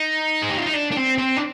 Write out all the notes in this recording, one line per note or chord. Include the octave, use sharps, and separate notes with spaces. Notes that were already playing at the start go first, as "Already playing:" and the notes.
Already playing: D#4
G#4
G4
F4
D#4
D4
D4
C4
C4
D4